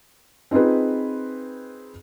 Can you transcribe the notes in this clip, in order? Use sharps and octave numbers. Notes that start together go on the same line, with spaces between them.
C4 D#4 F4 G#4 B4